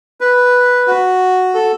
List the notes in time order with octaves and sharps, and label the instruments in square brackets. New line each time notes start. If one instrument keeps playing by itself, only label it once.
[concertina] B4
F#4
A4